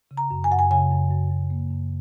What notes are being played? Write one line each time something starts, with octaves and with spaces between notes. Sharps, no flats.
C#3
A#5
F#2
G#5
F#2 F#5
G#5
C#3 G#5
F#2
F#2
F#2
A#3
F#2